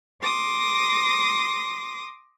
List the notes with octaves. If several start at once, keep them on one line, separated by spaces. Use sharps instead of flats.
C6 D6 D#6 A#6